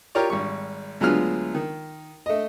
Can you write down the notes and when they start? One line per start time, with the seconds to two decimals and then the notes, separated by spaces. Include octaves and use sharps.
0.15 F4 G4 A#4 C#5 D5
0.30 G#1 G3 C#6
1.00 D2 F#3 G#3 B3 F4 F6
1.55 D#3
2.26 A3 D#5